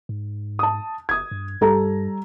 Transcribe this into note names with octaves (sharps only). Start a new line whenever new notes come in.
G#2
A5 D#6
F#1 D#6 G#6
G2
G2 G3 A4 A#5